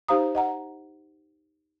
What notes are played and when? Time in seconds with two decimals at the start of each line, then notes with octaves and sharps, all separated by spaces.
0.08 D#4 G4 C5 F5 A#5 D#6
0.35 D#5 F#5 A#5